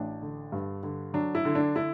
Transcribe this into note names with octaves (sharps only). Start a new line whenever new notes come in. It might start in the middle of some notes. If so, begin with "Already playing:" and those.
Already playing: A1 D4
D3
G2
D3
F#3 D4
E4
D3
D4
D3 E4